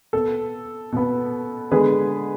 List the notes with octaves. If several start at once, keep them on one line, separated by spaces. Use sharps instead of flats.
B2 B3 A4
B2 B3
D3 G#3 B3 G#4 B4